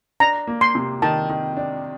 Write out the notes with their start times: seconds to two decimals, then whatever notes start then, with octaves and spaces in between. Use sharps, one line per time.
0.20 D4 A#5
0.47 A#3
0.61 C6
0.75 C3
1.02 D#3 A5
1.30 D#3
1.57 D4